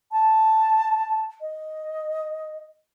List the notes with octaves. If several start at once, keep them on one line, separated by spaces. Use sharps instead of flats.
A5
D#5